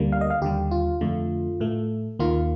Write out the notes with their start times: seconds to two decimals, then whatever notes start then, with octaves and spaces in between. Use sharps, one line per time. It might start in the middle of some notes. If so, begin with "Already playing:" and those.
Already playing: D2 D3 G3 A#3
0.12 F5
0.21 D#5
0.30 F5
0.42 D#2 D3 G3 G4
0.71 F4
1.01 F2 D3 A3
1.60 A2 A3
2.19 D#2 D#3 A#3 F4